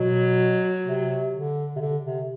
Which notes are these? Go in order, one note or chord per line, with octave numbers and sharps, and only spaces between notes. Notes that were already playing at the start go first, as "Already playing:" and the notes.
Already playing: B2 F#3
C3
D3
C3
D3
C3